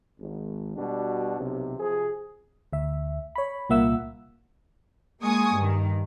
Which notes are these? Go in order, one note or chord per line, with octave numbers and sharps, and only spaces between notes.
G#1
B2 G3 D4 F#4
B1 C3
C3 F3 G#4
D2 E5
C#5 B5
C2 A#2 A#3 E5 F#5 E6
G#3 A#3 G#5 C#6 D#6
G2 D#3